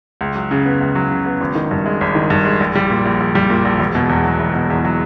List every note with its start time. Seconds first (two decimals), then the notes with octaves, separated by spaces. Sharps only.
0.21 C#2
0.36 F#3
0.51 C#3
0.66 B3
0.81 C#2
0.95 F#3
1.11 C#3
1.26 B3
1.41 G#1
1.55 D#3
1.71 G2
1.86 G#3
2.01 G#1
2.15 D#3
2.30 G2
2.45 G#3
2.60 A#1
2.75 G3
2.90 A#2
3.05 A#1
3.20 A#1
3.35 G3
3.50 A#2
3.65 A#1
3.79 E1
3.95 B2
4.09 E2
4.24 F#3
4.40 E1
4.55 B2
4.70 E2
4.85 F#3